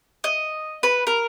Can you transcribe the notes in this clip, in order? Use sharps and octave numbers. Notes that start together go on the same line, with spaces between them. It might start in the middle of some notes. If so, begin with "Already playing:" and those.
D#5
B4
A#4